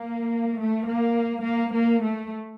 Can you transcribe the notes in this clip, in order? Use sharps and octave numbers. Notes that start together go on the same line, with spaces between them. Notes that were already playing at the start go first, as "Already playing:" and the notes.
Already playing: A#3
A3
A#3
A#3
A#3
A3